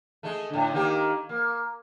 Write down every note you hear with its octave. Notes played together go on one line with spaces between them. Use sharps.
G#3 A3
A2 D3
D#3 A#3 G4
A#3